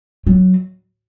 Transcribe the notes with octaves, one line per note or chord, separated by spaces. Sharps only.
F#3